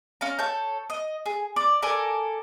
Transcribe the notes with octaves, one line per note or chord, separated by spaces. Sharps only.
C#4 F5 A#5
A4 C#5 G6
D#5
G#4
D5
A4 A#4 D5 G#5